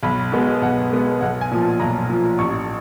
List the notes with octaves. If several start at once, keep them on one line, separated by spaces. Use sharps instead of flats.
B1 B5
B2 G#3 B3
B1 F#5
B2 G#3 B3
B1 F#5
G#5
A#2 F3
A5
B1 A#5
A#2 F3
A1 C#6